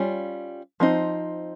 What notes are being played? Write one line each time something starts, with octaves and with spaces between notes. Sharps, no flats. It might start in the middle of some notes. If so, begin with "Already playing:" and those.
Already playing: G3 C#4 F4
F3 C4 D#4